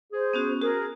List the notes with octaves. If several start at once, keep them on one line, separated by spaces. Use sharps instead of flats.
G#4 C5
B3 C#4 F#4
F#4 G#4 A#4